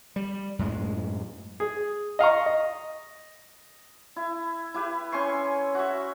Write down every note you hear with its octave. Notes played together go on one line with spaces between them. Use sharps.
G3
F#2 A2 G#3
G#4
D#5 F5 A#5 C#6
D#5
E4
E4 G4 B4
C#4 G#5 C6 C#6
F#4 E5